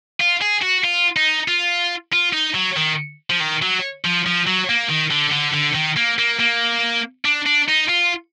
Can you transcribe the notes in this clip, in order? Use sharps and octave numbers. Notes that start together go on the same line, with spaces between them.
F4
G#4
F#4
F4
D#4
F4
F4
D#4
F#3
D#3
F3
D#3
F#3
F3
F3
F#3
A#3
D#3
D3
D3
D3
D#3
A#3
A#3
A#3
D4
D4
D#4
F4